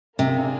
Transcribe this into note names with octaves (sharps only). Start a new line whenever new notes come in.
C3 A#3 D4 F4 G#4